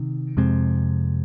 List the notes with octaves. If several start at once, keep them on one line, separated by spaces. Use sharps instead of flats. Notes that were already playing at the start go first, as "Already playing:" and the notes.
Already playing: C3 D#3
F2 C3 G#3 C4